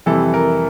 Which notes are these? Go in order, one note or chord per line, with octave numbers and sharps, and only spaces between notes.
F2 C3 E3 G3 A4
A#4